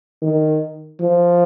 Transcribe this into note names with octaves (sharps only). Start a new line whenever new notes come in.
D#3
F3